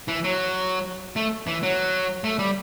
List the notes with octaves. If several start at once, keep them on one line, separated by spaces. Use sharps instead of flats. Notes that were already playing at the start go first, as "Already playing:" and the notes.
E3
F#3
A3
E3
F#3
A3
G3